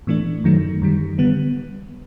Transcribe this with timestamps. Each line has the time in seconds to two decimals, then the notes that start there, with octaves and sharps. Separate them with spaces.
0.07 A2 E3 A3 D4
0.44 F#2 D#3 F#3 A3
0.82 F#2 D#3 G3
1.18 D3 G3 B3